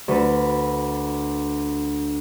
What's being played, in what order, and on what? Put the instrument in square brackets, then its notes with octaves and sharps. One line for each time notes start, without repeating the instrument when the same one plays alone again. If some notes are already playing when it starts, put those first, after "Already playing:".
[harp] D2 B4